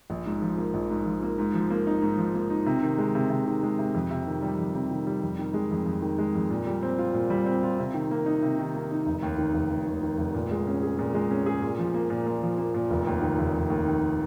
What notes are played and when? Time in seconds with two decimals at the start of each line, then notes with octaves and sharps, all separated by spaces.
0.10 A#1
0.26 G#2
0.42 F3
0.58 A#3
0.74 A#1
0.90 G#2
1.06 F3
1.23 A#3
1.39 G#2
1.54 F3
1.70 A#3
1.87 D#4
2.02 G#2
2.18 F3
2.34 A#3
2.50 D#4
2.66 C3
2.83 D#3
2.98 G#3
3.15 C3
3.30 C3
3.47 D#3
3.63 G#3
3.79 C3
3.95 F2
4.11 C3
4.27 D#3
4.42 G3
4.58 F2
4.75 C3
4.91 D#3
5.07 G3
5.22 F2
5.39 D#3
5.54 G#3
5.71 F2
5.86 F2
6.02 D#3
6.19 G#3
6.35 F2
6.50 A#2
6.67 G3
6.83 C4
6.99 F4
7.14 A#2
7.30 G3
7.46 C4
7.63 F4
7.79 C3
7.94 D#3
8.11 A#3
8.26 D#4
8.42 C3
8.59 D#3
8.75 A#3
8.91 D#4
9.06 F1
9.23 D#2
9.38 D#3
9.54 F1
9.71 F1
9.87 D#2
10.03 D#3
10.18 F1
10.34 A#2
10.51 G#3
10.67 C#4
10.83 G#4
10.99 A#2
11.14 G#3
11.31 C#4
11.46 G#4
11.62 A#2
11.79 F3
11.94 A#3
12.10 A#2
12.26 A#2
12.43 F3
12.58 A#3
12.74 A#2
12.91 F1
13.07 D#2
13.22 D#3
13.39 F1
13.54 F1
13.70 D#2
13.86 D#3